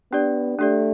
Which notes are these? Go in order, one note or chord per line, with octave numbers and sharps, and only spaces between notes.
B3 D4 G4 D5
A3 D4 G4 D5